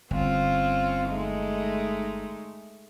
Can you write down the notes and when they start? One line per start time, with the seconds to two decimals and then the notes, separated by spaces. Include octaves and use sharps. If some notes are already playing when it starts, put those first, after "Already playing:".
0.11 G1 C4 C#4 F4
1.07 G#3 A3 D#4